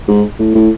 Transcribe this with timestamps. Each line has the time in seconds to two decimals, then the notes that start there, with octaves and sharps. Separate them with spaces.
0.08 G#2
0.39 A2
0.55 A2